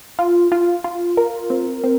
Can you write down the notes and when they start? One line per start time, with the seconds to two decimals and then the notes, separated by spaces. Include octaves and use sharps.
0.19 F4
0.52 F4
0.84 F4
1.17 A#4
1.50 C4
1.84 C4